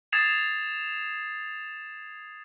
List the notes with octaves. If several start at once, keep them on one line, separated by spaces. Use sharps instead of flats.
D#6 G#6 A6 C7 E7 F7